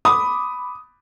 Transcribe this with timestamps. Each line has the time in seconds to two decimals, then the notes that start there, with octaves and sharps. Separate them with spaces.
0.05 B5 D6 D#6